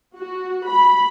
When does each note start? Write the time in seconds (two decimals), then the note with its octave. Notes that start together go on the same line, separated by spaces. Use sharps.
0.17 F#4
0.70 B5